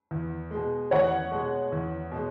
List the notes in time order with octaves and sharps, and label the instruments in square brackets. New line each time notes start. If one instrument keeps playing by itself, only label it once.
[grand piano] E2
B2 G#3
[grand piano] E2 [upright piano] C#5 F#5
[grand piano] B2 G#3
E2
B2 G#3